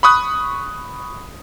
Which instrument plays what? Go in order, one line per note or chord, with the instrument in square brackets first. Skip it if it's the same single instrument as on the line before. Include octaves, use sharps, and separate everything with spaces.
[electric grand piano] B5 C#6 D#6 F#6